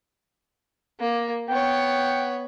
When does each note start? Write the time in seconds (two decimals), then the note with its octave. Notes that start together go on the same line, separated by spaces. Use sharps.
1.00 A#3
1.48 B3 C#5 G5